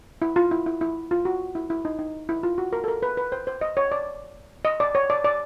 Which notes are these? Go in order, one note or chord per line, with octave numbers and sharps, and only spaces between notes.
E4
F4
E4
E4
E4
F4
F#4
E4
E4
D#4
D#4
E4
F4
F#4
A#4
A4
A#4
B4
B4
C5
C5
D#5
C#5
D5
D#5
D5
C#5
D5
D5